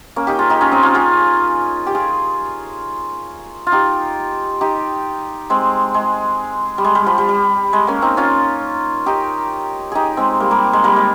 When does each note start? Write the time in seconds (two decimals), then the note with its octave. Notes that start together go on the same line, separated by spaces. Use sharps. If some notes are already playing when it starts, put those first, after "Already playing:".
0.16 A#3 C#4
0.27 D#4 G4
0.39 F4 G#4
0.50 D#4 G4
0.61 C#4 F4
0.72 C4 D#4
0.83 C#4 F4
0.94 F4 G#4
1.87 G4
1.95 F4 G#4
3.67 F4
3.72 D#4 G4
4.61 D#4 G4
5.50 G#3 C4
5.94 G#3
6.78 G3
6.85 G#3
6.95 G3
7.06 F3
7.18 G3
7.29 G3
7.73 G#3
7.87 A#3 C#4
8.02 C4 D#4
8.17 C#4 F4
9.06 D#4 G4
9.92 D#4 G4 G#4
10.17 G#3 C4
10.40 G3 A#3
10.51 G3 A#3
10.73 G#3
10.84 G3 A#3
10.96 G#3